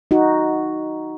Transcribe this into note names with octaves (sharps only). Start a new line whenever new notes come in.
D#4 F#4